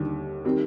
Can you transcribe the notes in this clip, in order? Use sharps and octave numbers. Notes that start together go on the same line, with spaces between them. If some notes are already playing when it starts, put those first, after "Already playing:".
Already playing: D#2 D3 G3
D#3 G3 C4